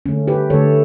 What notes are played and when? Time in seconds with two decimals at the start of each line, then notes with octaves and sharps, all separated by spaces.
0.06 D3 A3 C#4
0.28 G4 B4
0.50 D3 A3 A4 C#5